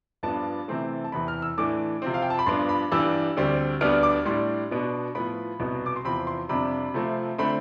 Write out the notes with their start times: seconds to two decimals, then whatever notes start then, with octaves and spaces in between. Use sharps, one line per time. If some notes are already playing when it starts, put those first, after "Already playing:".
0.23 G2 F3 B3 D4 A5
0.68 C3 E3 A3 C4
1.04 A5
1.12 E2 C3 E3 B5
1.28 F6
1.42 E6
1.58 A2 E3 A3 D4 D6
2.02 C3 F3 C4
2.14 F5
2.22 G5
2.30 A5
2.39 B5
2.46 G2 F3 B3 D4 C6
2.69 B5
2.92 G2 E3 G3 D4 E6
3.37 D2 D3 G3 C4
3.81 D2 D3 G3 B3 D4 F6
4.03 D6
4.25 A2 G3 D4 C6
4.71 B2 B3 D4
5.15 A2 F3 B3 B5
5.60 C2 B2 B3
5.86 D6
5.96 C6
6.05 E2 C3 F3 C4 B5
6.27 C6
6.49 F2 C3 G3 D4 B5
6.94 C3 F3 A3 C4
7.38 D3 A3 C4 B5